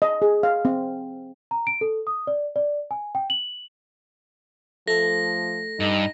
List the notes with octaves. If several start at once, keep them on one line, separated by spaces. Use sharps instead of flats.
D#5
G#4
F5
C4
A#5
D7
A4
D#6
D5
D5
G#5
G5
F#7
F3 A3 A4 A#6
G2 D#4